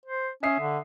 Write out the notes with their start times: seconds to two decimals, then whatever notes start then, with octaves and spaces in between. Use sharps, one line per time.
0.05 C5
0.43 C#4 E5 D#6 C7
0.59 D3